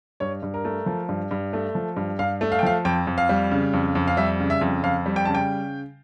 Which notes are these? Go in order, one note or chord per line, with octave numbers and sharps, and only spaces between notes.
G2 C#5
G2
A#4
A3
F3
G2
G2
A3
F3
G2
G2 F5
A3
F5
G5
F3 F5
F2 G5
F2
F5
G3
C#3
F2
F2
F5
G3 E5
C#3
E5
F2
F2 F5
G3
G5
C#3 A5
G5